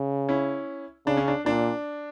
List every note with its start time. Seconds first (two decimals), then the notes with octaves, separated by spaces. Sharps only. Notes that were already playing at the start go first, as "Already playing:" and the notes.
Already playing: C#3
0.29 C#4 E4
1.07 C#3 D4
1.17 C#4
1.28 D4
1.45 A#2 D4